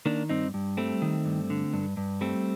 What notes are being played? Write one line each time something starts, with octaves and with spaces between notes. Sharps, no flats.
D#3 A#3 D4
G2 C4 D#4
G2
G3 A3 C4
D#3
G2
D3
G2
G2
G3 A3 C4